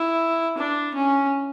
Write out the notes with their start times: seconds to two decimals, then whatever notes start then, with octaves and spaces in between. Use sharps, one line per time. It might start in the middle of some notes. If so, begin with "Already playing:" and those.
Already playing: E4
0.58 D4
0.94 C#4